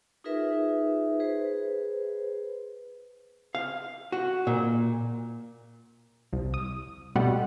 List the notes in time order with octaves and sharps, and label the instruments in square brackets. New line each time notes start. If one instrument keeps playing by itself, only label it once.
[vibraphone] D#4 F4 G#4 A#4 B4 E5
G#4 B4 C5
[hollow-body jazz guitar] F5
F#4
A#2
[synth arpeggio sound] C2
D#6
B2 G3 A3 B3 F#5